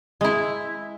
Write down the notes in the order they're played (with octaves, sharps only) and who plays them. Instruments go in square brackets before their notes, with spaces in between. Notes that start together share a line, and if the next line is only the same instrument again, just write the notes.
[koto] G#3 E4